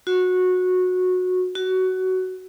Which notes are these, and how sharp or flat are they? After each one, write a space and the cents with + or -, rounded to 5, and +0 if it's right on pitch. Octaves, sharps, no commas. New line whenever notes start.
F#4 -15
F#4 +15